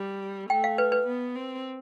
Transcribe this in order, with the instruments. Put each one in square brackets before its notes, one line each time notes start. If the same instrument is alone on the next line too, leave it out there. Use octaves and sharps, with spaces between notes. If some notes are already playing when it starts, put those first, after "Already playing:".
Already playing: [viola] G3
[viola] A3 [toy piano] G5
[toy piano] F5
B4
B4
[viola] B3
C4